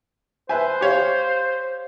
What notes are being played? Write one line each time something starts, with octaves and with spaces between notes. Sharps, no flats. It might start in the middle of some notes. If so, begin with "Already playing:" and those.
B4 C5 E5 G#5
G4 C#5 F5